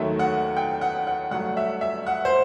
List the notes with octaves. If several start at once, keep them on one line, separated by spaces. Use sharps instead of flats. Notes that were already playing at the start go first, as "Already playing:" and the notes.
Already playing: D#2 D#3 F#3 A3 E5
F#5
G5
F#5
F#5
G2 F#3 A3 F#5
E5
E5
F#5
C5